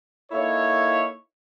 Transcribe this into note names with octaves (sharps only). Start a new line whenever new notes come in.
A#3 D#4 E4 A4 C#5